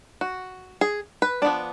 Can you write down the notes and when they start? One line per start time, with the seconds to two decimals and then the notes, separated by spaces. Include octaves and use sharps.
0.21 F#4
0.81 G#4
1.22 B4
1.42 F3 B3 D4 D5